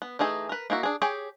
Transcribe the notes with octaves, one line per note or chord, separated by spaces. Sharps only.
B3
E3 A3 D#4 G#4
A#4 B4
A#3 D#4 E4 F#4
D4 G#4
G4 G#4 C#5 G5